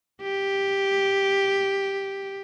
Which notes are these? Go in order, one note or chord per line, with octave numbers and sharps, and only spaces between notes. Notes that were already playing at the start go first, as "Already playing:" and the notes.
G4